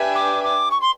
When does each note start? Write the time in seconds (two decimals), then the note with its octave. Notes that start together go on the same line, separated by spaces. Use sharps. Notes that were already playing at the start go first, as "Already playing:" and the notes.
Already playing: D4 G4 B4 E5 G#5
0.15 D6
0.44 D6
0.71 C#6
0.82 C6